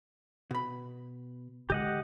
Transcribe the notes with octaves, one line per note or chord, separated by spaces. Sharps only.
B2 B5
D3 G#3 G4 D#5 F#5